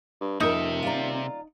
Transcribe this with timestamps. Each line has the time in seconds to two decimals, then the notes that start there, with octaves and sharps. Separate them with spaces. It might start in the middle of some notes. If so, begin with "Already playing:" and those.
0.21 G2
0.40 D#1 F2 C3 D#4 A#4 E5
0.83 F4 D5 A#5